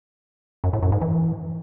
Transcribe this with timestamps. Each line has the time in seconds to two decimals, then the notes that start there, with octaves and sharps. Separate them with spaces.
0.64 F#2
0.73 A2
0.83 F#2
0.92 G#2
1.01 E3